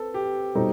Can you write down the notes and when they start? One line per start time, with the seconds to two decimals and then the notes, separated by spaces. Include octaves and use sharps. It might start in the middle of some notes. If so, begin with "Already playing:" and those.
Already playing: C4 A4 B4
0.14 G4
0.55 B2 G3 D#4 A4 C5